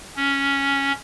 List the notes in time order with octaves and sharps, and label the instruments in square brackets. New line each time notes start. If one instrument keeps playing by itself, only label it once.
[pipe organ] C#4